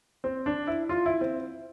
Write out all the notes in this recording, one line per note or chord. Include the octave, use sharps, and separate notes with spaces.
C4
D4
E4
F4
E4
C4